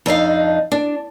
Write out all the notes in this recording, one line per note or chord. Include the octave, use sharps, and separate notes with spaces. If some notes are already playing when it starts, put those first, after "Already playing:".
F2 D4 D#4 F5
D4